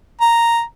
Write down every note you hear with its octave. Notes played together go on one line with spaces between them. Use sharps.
A#5